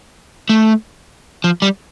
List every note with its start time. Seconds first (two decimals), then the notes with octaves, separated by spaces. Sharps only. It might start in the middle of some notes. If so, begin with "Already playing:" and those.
0.49 A3
1.44 F3
1.62 G3